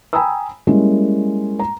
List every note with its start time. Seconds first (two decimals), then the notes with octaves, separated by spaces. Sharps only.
0.13 G5 G#5 A#5 B5 D#6 E6
0.67 G3 G#3 A#3 C#4 E4 A#4
1.59 A#5